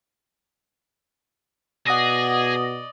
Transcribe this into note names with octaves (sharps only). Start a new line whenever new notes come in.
B2 G#4 D5 D#5 F#5 D#6 A#6